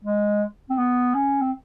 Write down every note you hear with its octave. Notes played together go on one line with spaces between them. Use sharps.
G#3
C4
B3
C#4
C4